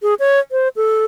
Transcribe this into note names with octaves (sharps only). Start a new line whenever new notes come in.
G#4
C#5
C5
A4